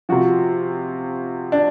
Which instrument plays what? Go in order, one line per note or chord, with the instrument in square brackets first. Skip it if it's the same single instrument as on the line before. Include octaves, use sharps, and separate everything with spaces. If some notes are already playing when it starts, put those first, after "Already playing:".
[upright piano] C3 F3 F#4
D4